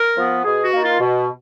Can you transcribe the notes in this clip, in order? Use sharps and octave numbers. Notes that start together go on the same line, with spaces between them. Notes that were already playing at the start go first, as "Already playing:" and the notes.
Already playing: A#4
F3 B3
B2 G#4
F#4
A#3 D#4
F4
B2